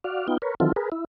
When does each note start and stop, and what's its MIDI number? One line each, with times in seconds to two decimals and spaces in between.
0.04 0.27 66
0.04 0.27 74
0.04 0.27 77
0.28 0.37 59
0.28 0.37 63
0.28 0.37 65
0.28 0.37 79
0.42 0.55 70
0.42 0.55 71
0.42 0.55 73
0.60 0.72 51
0.60 0.72 52
0.60 0.72 54
0.60 0.72 60
0.60 0.72 65
0.60 0.72 69
0.76 0.90 68
0.76 0.90 70
0.76 0.90 71
0.92 1.05 64